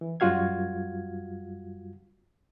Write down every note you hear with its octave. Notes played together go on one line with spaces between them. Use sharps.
E3
F#2 G3 F4 F#4 F5 G#6